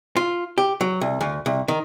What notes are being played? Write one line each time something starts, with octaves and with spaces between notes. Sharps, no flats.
F4
G4
F#3
C2
D2
C2
D#3